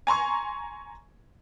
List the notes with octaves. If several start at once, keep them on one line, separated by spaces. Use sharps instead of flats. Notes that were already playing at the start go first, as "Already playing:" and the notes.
G#5 A#5 C6 C#6